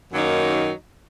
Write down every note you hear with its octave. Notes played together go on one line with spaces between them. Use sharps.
F#2 D#3 F#3 A#3 D#4